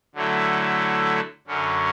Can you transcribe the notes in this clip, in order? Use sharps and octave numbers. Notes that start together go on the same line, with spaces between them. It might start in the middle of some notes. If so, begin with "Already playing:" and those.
D3 F#3 A3 E4
F#2 D3 F#3 C#4